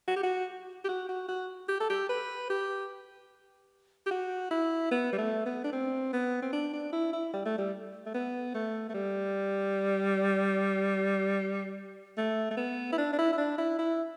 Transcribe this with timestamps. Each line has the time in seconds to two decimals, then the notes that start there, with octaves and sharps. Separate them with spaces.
0.08 F#4
0.16 G4
0.23 F#4
0.84 G4
0.88 F#4
1.09 F#4
1.28 F#4
1.69 G4
1.80 A4
1.90 G4
2.09 B4
2.50 G4
4.06 G4
4.11 F#4
4.51 E4
4.91 B3
5.13 G3
5.18 A3
5.46 B3
5.64 D4
5.72 C4
6.13 B3
6.42 C4
6.53 D4
6.73 D4
6.93 E4
7.13 E4
7.33 G3
7.45 A3
7.58 G3
8.06 A3
8.14 B3
8.55 A3
8.89 A3
8.94 G3
12.17 A3
12.51 A3
12.57 B3
12.92 E4
12.98 D4
13.13 D4
13.18 E4
13.32 E4
13.38 D4
13.58 E4
13.79 E4